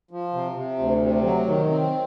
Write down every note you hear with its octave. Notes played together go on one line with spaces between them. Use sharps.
F3
C3
C3
D2
C3
F#3
D#3
C4